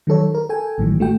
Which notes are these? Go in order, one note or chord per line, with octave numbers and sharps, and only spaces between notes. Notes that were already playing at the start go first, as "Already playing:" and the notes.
D#3 F#3 A4 C#5
A#4
A4 G5 G#5
A1 A2 D#3 E3 F#3 G3
A3 F#4 G5